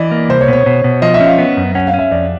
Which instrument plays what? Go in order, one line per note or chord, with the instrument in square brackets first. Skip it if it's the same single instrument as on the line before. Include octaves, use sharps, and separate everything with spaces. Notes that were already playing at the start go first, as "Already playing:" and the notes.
Already playing: [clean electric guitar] E3 [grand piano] D5 D#5
[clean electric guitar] A#3
[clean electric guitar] C2 [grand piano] C5
[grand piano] C#5
[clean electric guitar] B2
[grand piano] C#5
[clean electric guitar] B2
B2
[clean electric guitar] F3 [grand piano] D#5
[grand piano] E5
[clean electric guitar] C#4
[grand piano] F5
[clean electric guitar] B3
F#2
[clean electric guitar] C#4 [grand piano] F#5
[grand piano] F5
[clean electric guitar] C#4
[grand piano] E5
[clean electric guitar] F2 [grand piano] D5